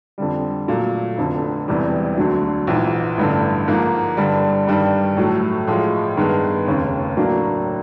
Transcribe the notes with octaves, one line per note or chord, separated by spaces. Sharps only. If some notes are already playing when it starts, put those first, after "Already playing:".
F2 D3 G3
A#2 F#3 A3
F1 F2 D3
E1 E2 C3 E3 G3
D2 D3 F#3
A#1 G#2 E3
A1 G2 D3
G#2 F3 A#3
G2 D3 G3
G2 D#3 G3
A2 F#3 A3
A2 F3 G#3
G2 D#3 G#3 B3
F1 D#2 C#3
A2 F#3 A#3 D4